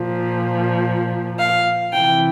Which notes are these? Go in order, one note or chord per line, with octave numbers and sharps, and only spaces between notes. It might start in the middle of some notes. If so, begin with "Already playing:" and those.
Already playing: A#2 F3
F5
C3 E3 G5